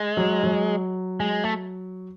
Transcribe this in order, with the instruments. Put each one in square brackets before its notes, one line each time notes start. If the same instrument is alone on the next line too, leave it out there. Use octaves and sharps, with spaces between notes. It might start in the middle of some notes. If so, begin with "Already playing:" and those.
Already playing: [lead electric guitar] G#3
[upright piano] F#3
F#3
[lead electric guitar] G#3
A3